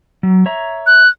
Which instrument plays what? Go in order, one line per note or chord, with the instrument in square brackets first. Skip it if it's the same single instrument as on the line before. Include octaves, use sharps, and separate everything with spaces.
[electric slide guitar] F#3
C#5 E5 A#5
[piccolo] F#6